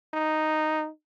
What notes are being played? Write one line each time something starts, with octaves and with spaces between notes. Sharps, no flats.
D#4